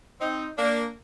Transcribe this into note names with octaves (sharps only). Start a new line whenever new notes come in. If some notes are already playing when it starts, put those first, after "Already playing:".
C4 D#4
A#3 D4